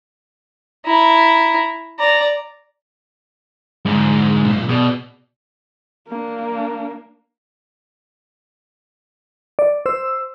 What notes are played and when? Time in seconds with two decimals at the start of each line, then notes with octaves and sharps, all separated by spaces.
0.86 E4 A#5
1.99 D5 A#5
3.86 F2 G#2 D3
4.44 B1 A#2
4.69 B2 G#4 D5
6.08 A#3 D4
9.59 D5
9.86 C5 E6